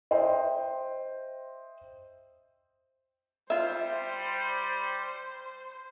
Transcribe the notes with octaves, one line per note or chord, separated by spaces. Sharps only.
C5 D#5 E5 G5 C6
G3 F4 C5 E5